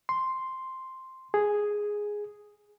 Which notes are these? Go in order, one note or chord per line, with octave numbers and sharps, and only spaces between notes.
C6
G#4